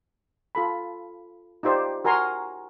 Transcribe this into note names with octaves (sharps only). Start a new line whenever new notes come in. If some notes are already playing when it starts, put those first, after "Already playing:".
F4 A4 B5
D#4 F4 G4 C5 D5
F#4 A#4 G#5 A#5 C6 C#6